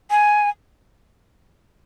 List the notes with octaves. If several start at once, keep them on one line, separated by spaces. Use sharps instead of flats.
G#5